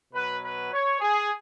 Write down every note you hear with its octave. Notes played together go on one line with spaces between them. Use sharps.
B2 F#3 B4
B4
C#5
G#4